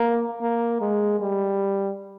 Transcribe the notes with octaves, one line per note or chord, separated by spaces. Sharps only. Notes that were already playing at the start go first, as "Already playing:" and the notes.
Already playing: A#3
A#3
G#3
G3